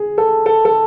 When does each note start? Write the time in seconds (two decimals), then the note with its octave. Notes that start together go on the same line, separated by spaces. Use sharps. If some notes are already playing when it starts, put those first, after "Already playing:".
Already playing: G#4
0.18 A4
0.46 A4
0.65 A4